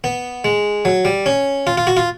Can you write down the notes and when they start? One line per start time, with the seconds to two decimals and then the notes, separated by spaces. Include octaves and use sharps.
0.04 B3
0.44 G#3
0.85 F#3
1.05 G3
1.26 C#4
1.67 F4
1.78 F4
1.87 F#4
1.97 F4